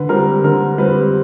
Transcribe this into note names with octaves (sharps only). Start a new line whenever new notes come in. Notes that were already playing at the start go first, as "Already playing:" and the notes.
Already playing: D3 B4
G3 C4 A#4
D3 A#4
G3 C4 B4